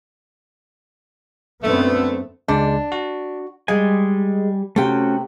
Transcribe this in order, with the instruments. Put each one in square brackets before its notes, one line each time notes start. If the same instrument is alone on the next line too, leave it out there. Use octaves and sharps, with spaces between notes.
[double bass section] F#2 B3 C4 [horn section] D3 A3
[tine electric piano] C#2 G#3 [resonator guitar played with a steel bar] D4
[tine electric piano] F#4
[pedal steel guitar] G3 G#5 [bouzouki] G#3
[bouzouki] C3 G5 [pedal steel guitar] A3 C#4 F#4